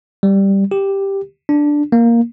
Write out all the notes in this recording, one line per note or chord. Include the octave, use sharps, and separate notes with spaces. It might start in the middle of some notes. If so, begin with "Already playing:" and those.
G3
G4
D4
A#3